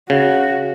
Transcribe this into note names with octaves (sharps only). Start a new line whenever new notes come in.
C#3 F#4